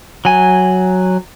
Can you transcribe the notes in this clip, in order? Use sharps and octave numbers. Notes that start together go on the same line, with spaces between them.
F#3 G#5